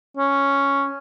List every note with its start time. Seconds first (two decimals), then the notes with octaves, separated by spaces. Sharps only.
0.18 C#4